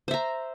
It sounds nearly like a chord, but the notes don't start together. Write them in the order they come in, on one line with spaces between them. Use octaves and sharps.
C5 E5 A#5